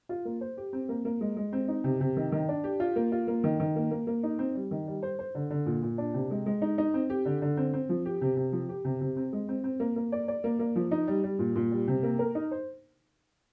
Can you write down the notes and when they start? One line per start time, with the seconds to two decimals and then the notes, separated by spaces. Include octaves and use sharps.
0.09 F4
0.25 A#3
0.41 C5
0.57 G4
0.73 C4
0.89 A#3
1.05 A#3
1.21 G#3
1.37 G#3
1.53 C4
1.68 D#4
1.84 C3
2.01 C3
2.17 D#3
2.32 D#3
2.48 D4
2.64 G4
2.80 F4
2.96 A#3
3.12 F4
3.27 A#3
3.44 D#3
3.60 D#3
3.76 A#3
3.91 A#3
4.07 A#3
4.23 D#4
4.39 C4
4.55 G3
4.71 D#3
4.87 G3
5.02 C5
5.19 C5
5.35 D3
5.50 D3
5.66 A#2
5.82 A#2
5.98 D4
6.14 C3
6.31 G#3
6.46 G#3
6.62 D#4
6.78 D#4
6.94 C4
7.10 G4
7.25 D3
7.42 D3
7.57 C4
7.73 C4
7.89 F3
8.05 G4
8.21 C3
8.37 C3
8.52 F3
8.69 G4
8.85 C3
9.01 C3
9.16 C4
9.33 G#3
9.48 C4
9.64 C4
9.80 A#3
9.96 A#3
10.12 D5
10.28 D5
10.44 A#3
10.59 A#3
10.76 F3
10.91 D#4
11.07 G3
11.23 G3
11.39 A#2
11.55 A#2
11.71 G3
11.88 C3
12.03 A#3
12.19 A#4
12.35 D#4
12.51 C5